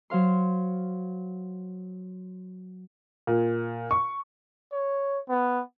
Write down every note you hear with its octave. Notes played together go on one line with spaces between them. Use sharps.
F#3 C5 F5 C6
A#2
C#6
C#5
B3